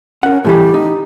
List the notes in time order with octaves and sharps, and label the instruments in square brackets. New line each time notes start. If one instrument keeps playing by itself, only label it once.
[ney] C#4 [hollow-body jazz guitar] A#4 F#5
[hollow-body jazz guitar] A2 E3 G3 [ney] G4
[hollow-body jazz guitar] D#4